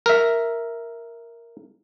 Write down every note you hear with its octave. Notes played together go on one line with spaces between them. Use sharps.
A#4 E5